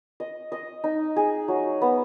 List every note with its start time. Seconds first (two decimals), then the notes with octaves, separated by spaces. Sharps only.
0.20 D#5
0.52 D#5
0.84 D#4
1.16 G#4
1.48 F#3
1.81 B3